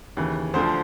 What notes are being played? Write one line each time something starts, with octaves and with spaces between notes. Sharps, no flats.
D#2 C#3 E3
D2 D3 F3 C5